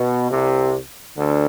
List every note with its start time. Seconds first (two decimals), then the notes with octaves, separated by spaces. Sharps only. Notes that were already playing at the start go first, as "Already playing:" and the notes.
Already playing: B2
0.31 C2 C3
1.17 D2 D3